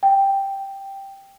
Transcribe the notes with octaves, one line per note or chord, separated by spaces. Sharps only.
G5